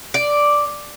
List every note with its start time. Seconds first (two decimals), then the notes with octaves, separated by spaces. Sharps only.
0.14 D5